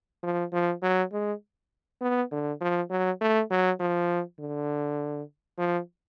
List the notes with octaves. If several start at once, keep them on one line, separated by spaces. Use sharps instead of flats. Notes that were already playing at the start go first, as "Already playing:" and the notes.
F3
F3
F#3
G#3
B3
D3
F3
F#3
A3
F#3
F3
D3
F3